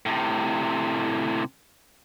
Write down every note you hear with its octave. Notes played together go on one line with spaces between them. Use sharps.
A2 C3